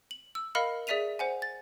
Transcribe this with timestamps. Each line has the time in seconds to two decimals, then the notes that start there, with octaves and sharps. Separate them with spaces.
0.11 F#7
0.35 E6
0.55 A#4 D#5 F5 B5 F6 C#7
0.87 G#4 D5 E5 B6 D#7 F7
1.19 C5 F#5 G#5
1.42 A6